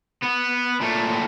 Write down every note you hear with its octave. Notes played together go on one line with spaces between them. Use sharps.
B3
A#2 A3